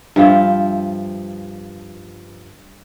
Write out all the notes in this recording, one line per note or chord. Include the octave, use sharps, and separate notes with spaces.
G2 F3 F4 E5